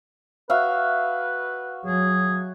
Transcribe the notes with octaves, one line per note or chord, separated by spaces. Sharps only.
F#4 B4 E5 F5
F#3 G#4